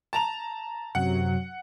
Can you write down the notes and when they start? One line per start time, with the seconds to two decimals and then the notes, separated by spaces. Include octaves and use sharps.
0.13 A5 A#5 F7
0.95 F#2 C3 F#3 F#5